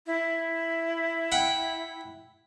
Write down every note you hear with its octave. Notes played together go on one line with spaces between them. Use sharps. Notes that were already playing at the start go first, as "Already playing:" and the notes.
E4
F#5 G5